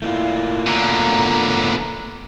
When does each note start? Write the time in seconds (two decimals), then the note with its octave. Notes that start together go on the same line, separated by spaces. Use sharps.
0.02 A3 A#3 E4 F4
0.67 B2 D3 A#5